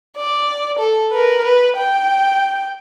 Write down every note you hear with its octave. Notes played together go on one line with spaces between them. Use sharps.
D5
A4
A#4 B4
B4
G5